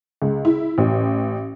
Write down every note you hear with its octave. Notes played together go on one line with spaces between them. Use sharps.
C#2
E4
A1